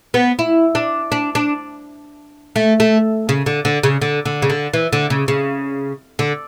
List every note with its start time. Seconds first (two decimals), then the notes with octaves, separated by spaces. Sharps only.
0.14 B3
0.39 E4
0.75 D4
1.12 D4
1.35 D4
2.56 A3
2.80 A3
3.29 C#3
3.46 D3
3.65 D3
3.83 C#3
4.02 D3
4.25 D3
4.42 C#3
4.50 D3
4.74 E3
4.93 D3
5.10 C#3
5.28 C#3
6.19 D3